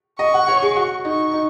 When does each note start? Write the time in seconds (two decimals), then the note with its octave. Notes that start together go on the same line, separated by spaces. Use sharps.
0.19 D#5 C#6
0.34 F#5
0.48 C#5
0.62 G#4
0.76 F#4
1.05 D#4 C#6
1.33 D#4